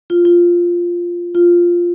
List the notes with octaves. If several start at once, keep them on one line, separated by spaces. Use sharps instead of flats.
F4
F4
F4